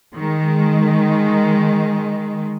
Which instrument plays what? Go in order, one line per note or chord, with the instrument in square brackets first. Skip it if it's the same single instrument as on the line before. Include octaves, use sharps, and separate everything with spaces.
[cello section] D#3 G#3